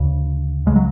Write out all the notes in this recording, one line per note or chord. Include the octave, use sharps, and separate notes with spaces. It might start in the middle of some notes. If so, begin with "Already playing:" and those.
Already playing: D2 C#3
C#2 C#3 G#3
F#3